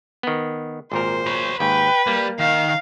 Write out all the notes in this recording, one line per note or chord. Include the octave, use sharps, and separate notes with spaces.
D#3 B3
G#1 A#2 A#4 C5
B4 C#5
D#2 G#2 B4 G5
G3 A#3
D#3 F5